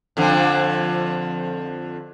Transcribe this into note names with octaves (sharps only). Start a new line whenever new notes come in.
F2 D3 F3